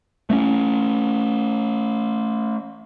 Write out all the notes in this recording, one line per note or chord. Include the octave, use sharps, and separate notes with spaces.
A3 A#3 C#4